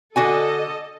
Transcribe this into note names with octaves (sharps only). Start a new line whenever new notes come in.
D3 F#4 A4 D#5 G#5